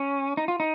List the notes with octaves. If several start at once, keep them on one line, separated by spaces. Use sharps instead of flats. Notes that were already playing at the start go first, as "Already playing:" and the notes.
Already playing: C#4
D#4
F4
D#4